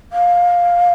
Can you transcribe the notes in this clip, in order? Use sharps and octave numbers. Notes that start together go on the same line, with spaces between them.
F5